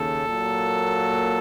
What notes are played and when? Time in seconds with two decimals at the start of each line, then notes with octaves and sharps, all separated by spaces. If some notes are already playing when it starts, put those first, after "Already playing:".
Already playing: D#2 C#3 A4
0.27 A#2 F#3 A#3